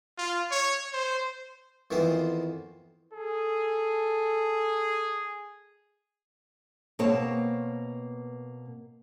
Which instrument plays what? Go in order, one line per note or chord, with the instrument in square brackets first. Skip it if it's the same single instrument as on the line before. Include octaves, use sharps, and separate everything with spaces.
[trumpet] F4
C#5
C5
[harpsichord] F2 D#3 E3 B3 C5 C6
[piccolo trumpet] G#4 [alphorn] A4
[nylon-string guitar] B2 A#3 C4 C#5 A5